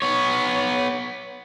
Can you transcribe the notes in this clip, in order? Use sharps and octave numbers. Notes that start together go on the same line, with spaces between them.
B3 C#5